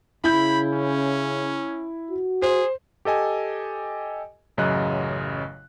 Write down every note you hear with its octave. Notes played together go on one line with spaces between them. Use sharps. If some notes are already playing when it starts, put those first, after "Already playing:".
C#3 E4 B5 G6
C#4
F#4
G#4 C5
G4 A4 D#5 G#5
A1 F#2 C#3 F#3 D#5 F#6